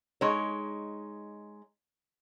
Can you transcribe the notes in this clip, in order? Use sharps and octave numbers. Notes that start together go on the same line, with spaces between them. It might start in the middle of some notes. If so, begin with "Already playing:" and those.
G#3 D#4 C#5